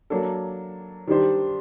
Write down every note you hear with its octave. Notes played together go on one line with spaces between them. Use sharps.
F#3 A#3 D4 A4
D#3 G3 D4 G4 C5